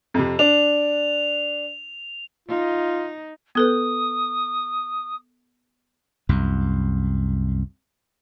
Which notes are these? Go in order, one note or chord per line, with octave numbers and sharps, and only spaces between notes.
F2 C3
D4 F7
D#4 F4
B3 A4 B4 D#6
C2 F#2